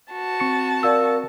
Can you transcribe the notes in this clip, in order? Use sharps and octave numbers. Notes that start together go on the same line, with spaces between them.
F#4 A5
C4 C#6 C#7
A#4 D5 F5 E6